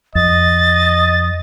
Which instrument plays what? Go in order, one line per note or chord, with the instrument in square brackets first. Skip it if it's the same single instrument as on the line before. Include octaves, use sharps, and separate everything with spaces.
[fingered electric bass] F2 [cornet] D#5 [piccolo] A6